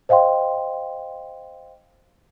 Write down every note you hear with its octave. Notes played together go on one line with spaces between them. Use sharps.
C5 D#5 F5 G5 C6